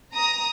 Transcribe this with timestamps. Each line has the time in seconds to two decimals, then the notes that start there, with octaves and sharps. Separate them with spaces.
0.13 A#5 D#6